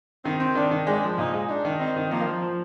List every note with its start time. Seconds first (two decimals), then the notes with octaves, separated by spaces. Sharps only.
0.24 D#3 C4
0.40 C4
0.55 D#3 D4
0.71 D#3
0.86 G#3 D4
1.03 F3
1.18 A#2 D#4
1.33 G#3
1.49 D4 D#4
1.65 D#3
1.80 C4 D#4
1.96 D#3
2.11 F3 A#3
2.27 F3
2.42 F3